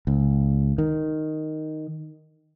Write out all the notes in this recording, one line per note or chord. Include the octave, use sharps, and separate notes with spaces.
C#2
D#3